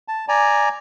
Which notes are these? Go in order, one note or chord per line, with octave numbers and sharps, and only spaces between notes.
A5
D5 G#5 A#5